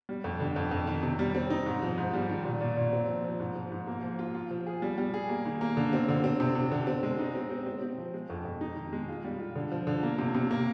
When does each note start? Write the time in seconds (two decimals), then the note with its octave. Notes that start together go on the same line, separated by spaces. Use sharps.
0.09 G3
0.24 F2
0.40 D3
0.56 F2
0.71 F2
0.87 D#3
1.03 C3
1.19 G3
1.35 C4
1.50 D#4
1.66 G#2
1.82 F3
1.98 G#2
2.14 G3
2.29 D#3
2.45 A#2
2.61 A#2
2.77 A#2
2.93 C4
3.09 F3
3.24 F3
3.40 G#2
3.56 F3
3.72 G#2
3.87 A#3
4.03 F3
4.19 F4
4.35 F4
4.51 F3
4.66 G#4
4.82 G3
4.98 G3
5.14 G#4
5.29 A#3
5.45 D#3
5.61 A#3
5.77 D3
5.93 C4
6.09 D3
6.24 C4
6.40 C3
6.55 C3
6.72 D3
6.87 C4
7.03 G#3
7.18 D#4
7.35 C4
7.50 C4
7.66 C4
7.82 C4
7.98 F3
8.14 G#3
8.30 F2
8.45 F2
8.61 D#4
8.76 D#3
8.93 G#3
9.08 F4
9.24 G3
9.40 F4
9.56 D3
9.72 F3
9.87 D3
10.03 A#3
10.19 C3
10.35 C3
10.51 A#3